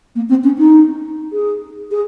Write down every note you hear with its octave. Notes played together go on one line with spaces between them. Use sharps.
A#3
C4
C#4
D#4
G#4
G#4